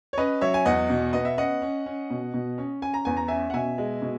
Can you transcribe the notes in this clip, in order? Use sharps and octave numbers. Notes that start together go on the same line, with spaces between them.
C#5
C#4 B4 D#5
F#3 C#5 E5
G#5
E2 D#5 F#5
B2
B3 D#5
E5
C#4 D#5 F#5
C#4
C#4
B2
B2
C#4
C#4 G#5
A#5
E2 G#5
A#5
C#4 E5 G#5
F#5
B2 E5 G#5
G#3
B2